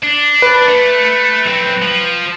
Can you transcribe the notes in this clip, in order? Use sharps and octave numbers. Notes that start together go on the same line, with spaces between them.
D4
B4
A3
B1 C4
F3